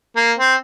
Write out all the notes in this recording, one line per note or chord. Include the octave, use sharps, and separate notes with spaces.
A#3
C4